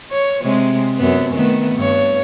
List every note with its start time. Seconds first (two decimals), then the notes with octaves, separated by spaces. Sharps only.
0.11 C#5
0.42 C3 G#3
0.98 F#2 B3
1.34 D#3 A3 B3
1.75 G2 C#5